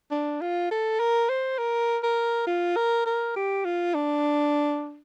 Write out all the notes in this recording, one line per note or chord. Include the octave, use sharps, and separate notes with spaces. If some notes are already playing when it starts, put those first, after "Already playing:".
D4
F4
A4
A#4
C5
A#4
A#4
F4
A#4
A#4
G4
F4
D4